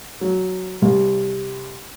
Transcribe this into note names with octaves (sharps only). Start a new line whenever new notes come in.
F#3
C2